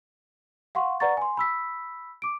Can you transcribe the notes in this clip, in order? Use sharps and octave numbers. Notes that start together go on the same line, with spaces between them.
F5 F#5 C6 C#6
B4 D5 F#5 A#5 C#6 A6
G#5 C6
B5 E6 B6
D6 D7